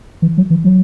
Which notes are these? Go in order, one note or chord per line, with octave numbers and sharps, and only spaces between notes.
E3
F#3
E3
F#3